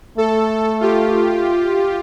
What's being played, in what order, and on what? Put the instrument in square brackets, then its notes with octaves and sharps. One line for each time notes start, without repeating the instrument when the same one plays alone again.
[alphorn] A3 [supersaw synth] A4
[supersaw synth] F4 G4